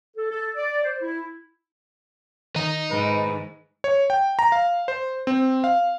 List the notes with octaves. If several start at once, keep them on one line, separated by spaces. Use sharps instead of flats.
A4
A4
D5
C5
E4
D#3 D#5 A#5
G#2 B4
C#5
G5
A#5
F5
C5
C4
F5